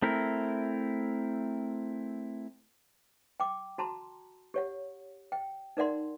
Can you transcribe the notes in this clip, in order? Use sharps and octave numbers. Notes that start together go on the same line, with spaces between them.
A3 C4 E4 A#4
G5 D6
F#4 A5 A#5 C6
G4 C#5 F#5
G5
D#4 A#4 D5 F#5 C6